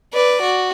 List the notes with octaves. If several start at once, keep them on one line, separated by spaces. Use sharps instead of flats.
B4 D5
F#4